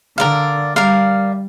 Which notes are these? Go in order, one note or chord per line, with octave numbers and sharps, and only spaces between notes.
D3 A#4 D5 F5
G3 A#4 D5 F5